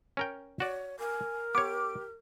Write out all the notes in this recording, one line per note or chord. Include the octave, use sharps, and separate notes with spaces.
C#4 A#4 G5
F#4 C#5 D5
A#4 G#5
B3 G4 C#5 D6